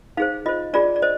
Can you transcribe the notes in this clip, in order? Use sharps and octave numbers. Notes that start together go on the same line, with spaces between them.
D#4 G#4 C5 F5
F4 C5 D#5
D4 F4 G#4 D5
D5
C5 D#5